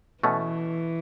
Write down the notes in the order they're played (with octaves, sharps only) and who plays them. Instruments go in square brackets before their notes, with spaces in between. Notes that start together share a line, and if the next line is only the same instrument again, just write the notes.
[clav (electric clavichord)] B2 A3 C#4 [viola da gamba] E3